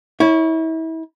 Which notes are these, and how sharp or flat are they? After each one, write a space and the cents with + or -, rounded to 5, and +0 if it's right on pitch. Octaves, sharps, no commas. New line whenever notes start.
E4 -35 C#5 +0